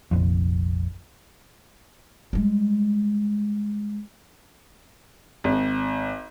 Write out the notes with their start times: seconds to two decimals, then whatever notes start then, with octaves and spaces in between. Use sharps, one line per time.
0.11 F1 A#1 F2
2.33 G3 G#3
5.44 G#1